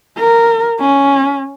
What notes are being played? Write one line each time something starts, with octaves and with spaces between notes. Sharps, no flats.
A#4
C#4